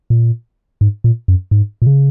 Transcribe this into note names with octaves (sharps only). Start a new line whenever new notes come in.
A#2
G#2
A#2
F#2
G#2
A#2
C#3